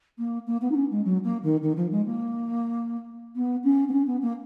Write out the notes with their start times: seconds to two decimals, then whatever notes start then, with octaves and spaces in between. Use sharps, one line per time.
0.18 A#3
0.47 A#3
0.61 B3
0.71 D#4
0.76 C#4
0.91 G#3
1.04 F#3
1.24 A#3
1.43 D#3
1.62 D#3
1.76 F3
1.91 G#3
2.06 A#3
3.36 B3
3.64 C#4
3.88 B3
3.92 C#4
4.07 B3
4.22 A#3